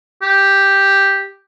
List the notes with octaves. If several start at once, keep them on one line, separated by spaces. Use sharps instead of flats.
G4